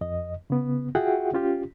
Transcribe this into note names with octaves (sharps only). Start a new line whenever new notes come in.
F2 D#5
C#3 B3
F4 F#4 G#4 E5 F#5 G5
C#4 F4 G4